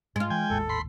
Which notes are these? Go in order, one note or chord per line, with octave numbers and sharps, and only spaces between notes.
G#2 G#3 F4
E3 G5 G#5
G#1 D#2 A2 A4
B5 C6